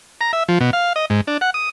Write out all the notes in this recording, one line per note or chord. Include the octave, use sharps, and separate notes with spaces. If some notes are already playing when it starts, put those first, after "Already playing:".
A#5
E5
F3
B2
F5
D#5
G#2
D4
F#5
D#6